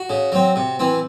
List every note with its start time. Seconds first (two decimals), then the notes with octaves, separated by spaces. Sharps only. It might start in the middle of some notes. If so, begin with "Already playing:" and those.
Already playing: F#4
0.10 C#3
0.32 F#3 C4
0.56 C3
0.79 E3 C4